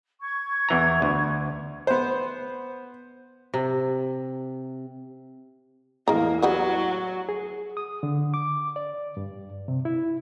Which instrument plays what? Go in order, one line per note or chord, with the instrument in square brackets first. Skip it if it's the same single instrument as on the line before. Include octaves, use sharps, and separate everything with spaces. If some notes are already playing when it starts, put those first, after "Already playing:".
[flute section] C#6 G#6
[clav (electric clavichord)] E2 E3 A#5
D2
[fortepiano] B3 C5
[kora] C3
[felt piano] E2 A2 [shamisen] G#3 A#5 [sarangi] A#3
[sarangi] F#3 [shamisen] G3 B3 F#4
[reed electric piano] G#4
D#6
D3
D6
D5
G2
C3
E4